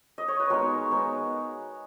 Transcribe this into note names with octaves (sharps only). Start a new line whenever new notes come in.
D#5
C#5
B4
G#3 B3 D#4 F#4 A#4
G#3 B3 D#4